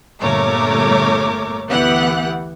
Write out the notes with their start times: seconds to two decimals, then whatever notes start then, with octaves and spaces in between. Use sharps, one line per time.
0.21 G1 A#2 A3 A#4 C#5 D6
1.68 D2 E3 B3 G4 F#5 F#6